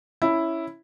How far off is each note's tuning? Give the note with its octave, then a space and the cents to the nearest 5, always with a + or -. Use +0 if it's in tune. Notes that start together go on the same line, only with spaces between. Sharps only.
C#4 +0 E4 +0